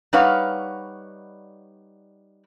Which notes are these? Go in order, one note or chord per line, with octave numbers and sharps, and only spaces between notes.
G3 D#4 B4 C#5 F5 F#5